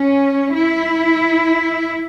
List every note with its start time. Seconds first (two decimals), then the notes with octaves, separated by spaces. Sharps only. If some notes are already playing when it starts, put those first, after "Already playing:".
Already playing: C#4
0.54 E4